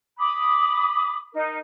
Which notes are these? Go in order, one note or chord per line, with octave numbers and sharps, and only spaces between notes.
B5 D6 D#6
D#4 A#4